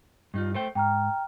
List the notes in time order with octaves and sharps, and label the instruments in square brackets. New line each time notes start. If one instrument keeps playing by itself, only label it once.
[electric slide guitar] G2 D#4 F4
A3 C5 G5
[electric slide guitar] G#2 [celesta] G5 A#5 F6